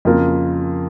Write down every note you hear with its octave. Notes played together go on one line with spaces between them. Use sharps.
F2 C#3 A#3 F4 A#4